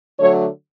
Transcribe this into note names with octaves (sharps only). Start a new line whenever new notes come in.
D3 F#3 A3 C#5